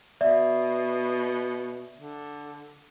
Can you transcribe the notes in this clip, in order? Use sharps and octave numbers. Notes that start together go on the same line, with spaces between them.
B2 D5 E5
D3